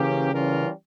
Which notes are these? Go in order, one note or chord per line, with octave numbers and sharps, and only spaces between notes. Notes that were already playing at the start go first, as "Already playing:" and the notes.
Already playing: C#3 E3 A#3 C#4 G4
E3 G3 C#4 F4 A#4